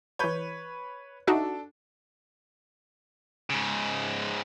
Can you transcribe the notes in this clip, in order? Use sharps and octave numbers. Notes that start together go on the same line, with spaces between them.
E3 B4 C#5 G6
D4 D#4 F#4 A4 E5
G#2 C#3